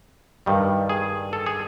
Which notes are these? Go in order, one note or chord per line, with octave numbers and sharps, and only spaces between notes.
G2 D#3 G3
G#4
A4
G#4